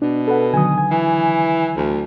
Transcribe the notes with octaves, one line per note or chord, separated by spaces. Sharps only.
B2 D4
A4 B4 F#5
D3 D#3 F#3 G#5 D#6
G#5
E3
D2